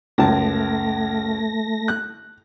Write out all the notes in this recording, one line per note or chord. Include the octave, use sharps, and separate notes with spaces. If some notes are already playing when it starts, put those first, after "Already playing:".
C#2 F#2 A3 A5 A#6
F#6